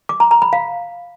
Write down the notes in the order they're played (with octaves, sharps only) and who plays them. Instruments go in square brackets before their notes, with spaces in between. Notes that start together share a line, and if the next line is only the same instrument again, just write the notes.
[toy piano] D6
A#5
A#5
B5
F5